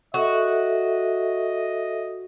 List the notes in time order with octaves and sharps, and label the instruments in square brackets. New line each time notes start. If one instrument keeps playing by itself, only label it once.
[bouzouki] F#4 [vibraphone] A4 E5 [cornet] D#5